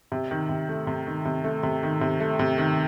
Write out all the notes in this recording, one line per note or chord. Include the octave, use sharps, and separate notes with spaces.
C3
D#3
C3
A3
C3
D#3
C3
A3
C3
D#3
C3
A3
C3
D#3